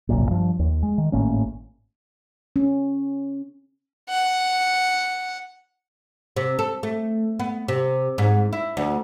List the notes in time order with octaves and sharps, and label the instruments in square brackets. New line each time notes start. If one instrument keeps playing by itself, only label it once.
[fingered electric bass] G1 C2 F#2 A#2
G2 F3
D#2
G#3
D#3
G#1 A2 A#3 C#4
[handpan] C#4
[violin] F#5
[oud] C3
A4
A3
B3
C3
G#2
E4
D2